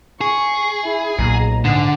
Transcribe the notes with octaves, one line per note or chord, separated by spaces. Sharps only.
G#4 C#6
E4
B1 A#2 A#5
G#2 D3 F#5